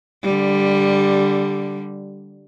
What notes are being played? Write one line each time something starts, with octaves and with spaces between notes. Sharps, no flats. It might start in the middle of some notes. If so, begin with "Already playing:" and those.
D3 G3